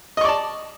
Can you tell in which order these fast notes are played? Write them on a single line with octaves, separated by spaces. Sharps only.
D#5 C#6 D5 A5